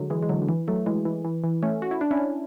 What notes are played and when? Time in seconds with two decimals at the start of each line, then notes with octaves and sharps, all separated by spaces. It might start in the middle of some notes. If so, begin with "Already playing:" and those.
Already playing: D3 F#3 G#3
0.10 E3 G#3
0.23 G#3
0.29 D3 F#3
0.42 D3
0.49 E3
0.68 F#3 A3
0.86 E3 G#3
1.05 E3
1.25 E3
1.44 E3
1.63 A3 C#4
1.82 F#4
1.91 E4
2.01 D4
2.11 C#4 E4